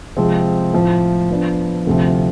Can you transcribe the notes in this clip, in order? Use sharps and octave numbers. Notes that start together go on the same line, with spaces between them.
C3 F3 G#3 C4 G#4
A2 F3 A3
F3 B3 D4
D2 C3 F3